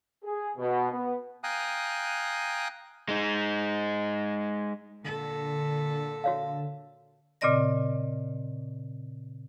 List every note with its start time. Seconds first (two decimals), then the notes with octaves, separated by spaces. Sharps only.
0.23 G#4
0.57 B2
0.92 B3
1.44 F5 G5 G#5 A#5 D#6 F#6
3.09 G#3 D#4
5.04 A#2 D3 A4
6.24 F#4 C#5 F5
7.41 A#2 C#3 C4 D5 D#5 A#6